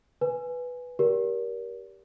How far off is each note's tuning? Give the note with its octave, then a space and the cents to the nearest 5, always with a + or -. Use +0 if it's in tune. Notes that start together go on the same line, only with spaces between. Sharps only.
B4 +0 G#5 +0
G4 -10 A#4 +25 D5 -40